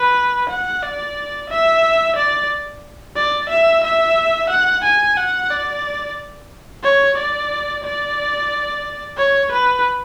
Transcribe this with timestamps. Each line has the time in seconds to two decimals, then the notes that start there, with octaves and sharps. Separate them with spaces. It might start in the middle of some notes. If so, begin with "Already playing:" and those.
Already playing: B4
0.50 F#5
0.82 D5
1.50 E5
2.16 D5
3.16 D5
3.50 E5
3.84 E5
4.50 F#5
4.84 G#5
5.17 F#5
5.51 D5
6.84 C#5
7.18 D5
7.84 D5
9.17 C#5
9.52 B4